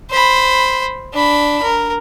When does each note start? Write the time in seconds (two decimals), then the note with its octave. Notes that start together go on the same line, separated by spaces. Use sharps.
0.11 C5 B5
1.13 D4 B5
1.63 A#4